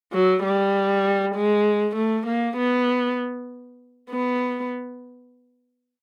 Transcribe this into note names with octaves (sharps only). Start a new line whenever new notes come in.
F#3
G3
G#3
A3
A#3
B3
B3